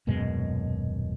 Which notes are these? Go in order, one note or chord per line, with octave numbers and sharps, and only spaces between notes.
D#1 F#2 B2 G#3